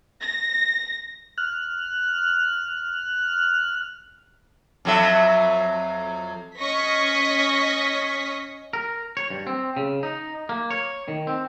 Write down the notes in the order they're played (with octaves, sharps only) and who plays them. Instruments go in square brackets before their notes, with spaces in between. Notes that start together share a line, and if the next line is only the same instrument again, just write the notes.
[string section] A#6
[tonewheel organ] F6 F#6
[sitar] F2 F#3 E5
[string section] C#4 D#5 C#6 D#6 A#6 B6
[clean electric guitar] A#4
C#5
G2
C4
C#3
D#4
A#3
C#5
D#3
C4